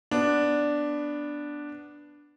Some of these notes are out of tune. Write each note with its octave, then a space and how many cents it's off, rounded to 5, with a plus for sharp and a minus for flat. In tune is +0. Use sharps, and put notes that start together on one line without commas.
B3 +0 D4 +0